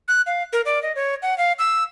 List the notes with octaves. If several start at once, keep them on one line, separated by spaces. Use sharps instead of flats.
F#6
F5
A#4
D5
D#5
C#5
F#5
F5
E6